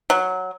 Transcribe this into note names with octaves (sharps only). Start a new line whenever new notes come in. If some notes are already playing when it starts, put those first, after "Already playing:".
F#3